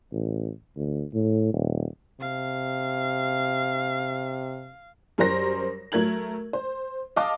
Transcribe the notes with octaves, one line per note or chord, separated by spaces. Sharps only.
A1
D2
A2
D#1
C3 F5
F#2 G3 A#4 C5 A#6
F#3 A3 A#4 G#6 F#7
C5
D#5 F5 A5 D6